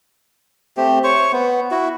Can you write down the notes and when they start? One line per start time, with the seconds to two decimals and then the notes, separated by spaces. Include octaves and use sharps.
0.77 A3 C4 G4
1.04 C5 C#5 C#6
1.33 B3
1.71 E4 F#4